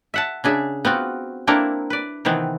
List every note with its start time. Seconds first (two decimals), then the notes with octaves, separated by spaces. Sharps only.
0.14 E5 F#5 A5
0.44 C#3 D4 G#4 E5
0.85 B3 C4 F4 F#4
1.47 A#3 C4 D4 E4 A4 A#4
1.90 B4 D5
2.25 C3 D#3 E3 B3 C4